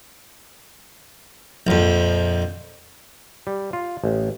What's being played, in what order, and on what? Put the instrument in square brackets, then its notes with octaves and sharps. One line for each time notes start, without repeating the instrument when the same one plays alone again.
[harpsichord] A#1 F2
[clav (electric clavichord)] G3
F4
A1